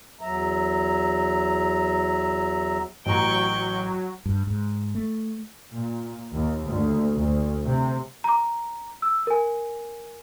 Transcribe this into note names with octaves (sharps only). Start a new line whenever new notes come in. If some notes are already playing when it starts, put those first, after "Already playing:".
E2 F#3 E5 A#5
A1 F#3 G5 A#5 C#6
G2
G#2
A3
A#2
D#2
D2
D2
C3
A#5 D6
E6
A#4 G#5